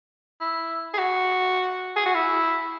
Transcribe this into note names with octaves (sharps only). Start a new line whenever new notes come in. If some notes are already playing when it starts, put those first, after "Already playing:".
E4
G#4
F#4
G#4
F#4
E4